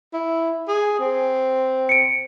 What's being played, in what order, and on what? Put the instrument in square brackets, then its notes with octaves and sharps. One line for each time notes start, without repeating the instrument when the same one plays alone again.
[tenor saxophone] E4
G#4
C4
[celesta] C#7 D7